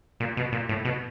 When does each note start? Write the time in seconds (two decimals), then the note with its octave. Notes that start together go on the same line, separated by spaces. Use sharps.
0.20 A#2
0.37 B2
0.53 A#2
0.69 A2
0.85 B2